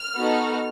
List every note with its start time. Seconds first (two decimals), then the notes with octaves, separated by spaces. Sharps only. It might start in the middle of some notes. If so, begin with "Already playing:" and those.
Already playing: F6
0.17 B3 D#4 F#4 A4